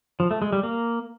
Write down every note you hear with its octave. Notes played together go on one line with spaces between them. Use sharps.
F3
A3
G#3
G3
A#3